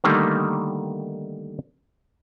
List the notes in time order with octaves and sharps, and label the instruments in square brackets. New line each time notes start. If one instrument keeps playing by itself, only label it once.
[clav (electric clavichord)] D3 D#3 G3 A3 A#3 D#4